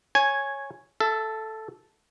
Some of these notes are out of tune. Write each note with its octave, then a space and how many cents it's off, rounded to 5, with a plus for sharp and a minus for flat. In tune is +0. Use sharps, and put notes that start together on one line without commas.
C#5 -10 G#5 +0
A4 -5 E5 +30